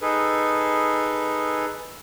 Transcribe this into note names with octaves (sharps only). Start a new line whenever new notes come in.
D#4 G#4 A4 B4